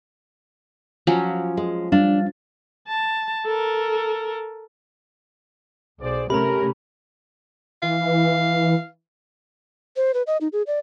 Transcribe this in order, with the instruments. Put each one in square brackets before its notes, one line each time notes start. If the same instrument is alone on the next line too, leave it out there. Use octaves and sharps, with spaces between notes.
[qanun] F3 F#3 C#4
[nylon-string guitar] G#3
[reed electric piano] G3 F5 [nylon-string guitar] D4
[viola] A5
A4 A#4
[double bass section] B1 [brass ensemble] G#4 C5 D5
[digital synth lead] C3 [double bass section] A3 C#4 [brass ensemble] A#4 [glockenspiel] A#5 B5
[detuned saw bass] E3 [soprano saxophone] F5
[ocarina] C5
B4
D#5
D#4
G#4
D5